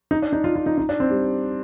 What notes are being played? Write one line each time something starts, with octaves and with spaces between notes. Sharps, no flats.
D#4
D4
D#4
F4
F4
D#4
D#4
D4
C4
G3